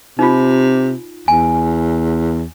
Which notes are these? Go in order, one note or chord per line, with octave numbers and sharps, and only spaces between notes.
C3 D#4 F4
E2 G#5